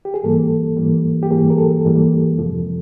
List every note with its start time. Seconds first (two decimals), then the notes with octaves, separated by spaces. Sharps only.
0.05 G4
0.14 G#4
0.23 G#2 E3 G3 A#3 A4
0.77 G#2 E3 G3 A#3
1.23 G4
1.31 G#2 E3 G3 A#3 G#4
1.50 A#4
1.58 A4
1.85 G#2 E3 G3 A#3
2.38 F2 C3 F3 G#3